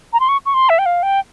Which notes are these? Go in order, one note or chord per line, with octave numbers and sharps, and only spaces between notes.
A#5
C6
C#6
C#6
C6
E5
G5
F5
G5